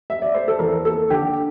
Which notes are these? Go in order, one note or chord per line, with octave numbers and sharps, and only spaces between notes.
E5
D5
A3 C5
A4
E2 A#4
A#3 A4
D3 G4